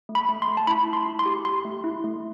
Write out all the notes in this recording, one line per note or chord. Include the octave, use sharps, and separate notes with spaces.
A3
B5
A3
C6
A3
A5
E4 B5
E4
C6
E4
C6
G4
G4 C6
A3
E4
A3